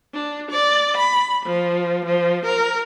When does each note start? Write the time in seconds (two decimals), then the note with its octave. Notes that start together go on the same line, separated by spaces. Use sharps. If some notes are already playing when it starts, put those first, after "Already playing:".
0.14 D4
0.52 D5
0.98 B5
1.46 F3
2.06 F3
2.46 A#4